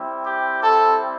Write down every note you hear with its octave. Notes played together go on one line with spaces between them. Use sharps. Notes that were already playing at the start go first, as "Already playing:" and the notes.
Already playing: G3 C4 E4
G4
A4